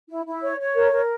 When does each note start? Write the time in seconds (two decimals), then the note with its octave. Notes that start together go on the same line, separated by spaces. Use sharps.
0.09 E4
0.25 E4
0.42 C#5
0.60 C#5
0.76 A#4
0.92 A#4